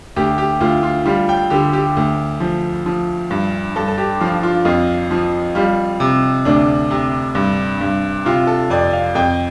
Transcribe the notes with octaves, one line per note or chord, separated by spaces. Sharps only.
D2 G4
G4
D2 F4
F4
G3 F4
G5
D3 G4
G4
D2
F3
F3
G2
G2 A4
A4
G4
F3 F4
F4
F2 F4
F3
G3 F4
C3
D2 D4
C3
G2
G2
C3 F4
A4
F2 D5
F5
F2 G5